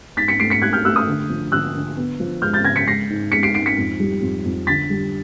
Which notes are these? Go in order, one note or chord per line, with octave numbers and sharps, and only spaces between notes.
G#2 A6 B6
B6 C#7
A3 C7 D7
B6 C#7
G#2 F#6 G#6
F6 G6
A3 E6 F#6
D#6 F6
D3
F3
D3 E6 F#6
D3
B3
F3
G#3 F6 G6
G6 A6
C#3 G#6 A#6
B6 C#7
G#3 A#6 C7
G#2
G#3 B6 C#7
C7 D7
G#2 C7 D7
B6 C#7
F2
G3
F2
F2
D3 A6 B6
G3